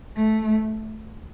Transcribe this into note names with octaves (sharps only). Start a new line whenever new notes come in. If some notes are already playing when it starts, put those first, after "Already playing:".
A3